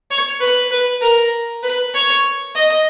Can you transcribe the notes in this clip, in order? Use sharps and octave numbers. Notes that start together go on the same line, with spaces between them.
C#5
B4
B4
A#4
B4
C#5
D#5